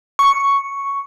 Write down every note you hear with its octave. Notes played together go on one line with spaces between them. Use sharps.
C#6